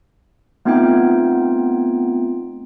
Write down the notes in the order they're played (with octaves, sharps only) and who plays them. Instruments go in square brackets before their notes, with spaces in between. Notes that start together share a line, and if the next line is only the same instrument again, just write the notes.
[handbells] A3 B3 C4 D#4 F4 G5